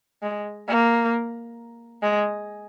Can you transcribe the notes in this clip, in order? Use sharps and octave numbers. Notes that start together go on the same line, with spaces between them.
G#3
A#3
G#3